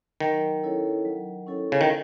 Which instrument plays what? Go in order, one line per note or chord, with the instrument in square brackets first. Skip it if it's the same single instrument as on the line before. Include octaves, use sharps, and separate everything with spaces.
[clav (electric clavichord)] D#3 [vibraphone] F#3
[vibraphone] C#4 E4 A4 C#5
F#3
C#4 E4 A4 C#5
[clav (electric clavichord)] C#3
D#3